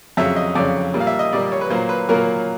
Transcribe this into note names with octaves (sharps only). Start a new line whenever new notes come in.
F2 C#3 F#3 E5
D#5
F2 C#3 F#3 D5
A#2 G3 A#3
F5
E5
D#5
A#2 G3 A#3 D5
C#5
B4
A#2 F#3 A#3 C5
B4
A#2 F#3 A#3 A#4